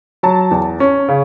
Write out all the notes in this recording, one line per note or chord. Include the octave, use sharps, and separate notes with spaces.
F#3 A5
E2
C#4
C#3